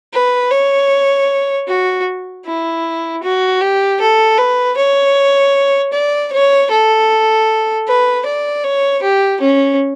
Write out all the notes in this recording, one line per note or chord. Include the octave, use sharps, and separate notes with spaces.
B4
C#5
F#4
E4
F#4
G4
A4
B4
C#5
D5
C#5
A4
B4
D5
C#5
G4
C#4